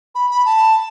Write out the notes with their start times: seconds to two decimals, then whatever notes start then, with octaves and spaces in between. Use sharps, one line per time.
0.15 B5
0.31 B5
0.46 A5